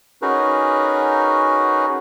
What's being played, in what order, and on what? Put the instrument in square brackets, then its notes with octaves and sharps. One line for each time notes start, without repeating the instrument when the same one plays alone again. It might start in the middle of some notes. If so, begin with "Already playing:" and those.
[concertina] C#4 D#4 F#4 G#4 A#4 B4